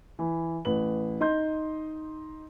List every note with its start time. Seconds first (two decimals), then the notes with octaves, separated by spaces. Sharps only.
0.19 E3 B5
0.65 A1 B4 F#7
1.20 D#4 D#5 C6 G6